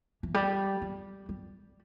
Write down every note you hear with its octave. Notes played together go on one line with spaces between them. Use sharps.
E3
G3
G3
G3